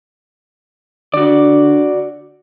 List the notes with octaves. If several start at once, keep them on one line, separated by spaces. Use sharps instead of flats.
D3 F#4 D5